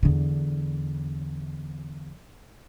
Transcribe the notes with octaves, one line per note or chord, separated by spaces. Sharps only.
E2 D3